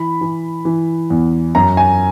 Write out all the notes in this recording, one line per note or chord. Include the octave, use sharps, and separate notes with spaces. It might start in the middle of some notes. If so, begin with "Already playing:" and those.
Already playing: E3 B5
E3
E3
E2
F#2 A#5
G#5